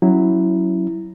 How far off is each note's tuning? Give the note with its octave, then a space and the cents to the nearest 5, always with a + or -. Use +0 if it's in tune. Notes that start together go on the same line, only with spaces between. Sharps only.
F#3 +5 C#4 -10 E4 +0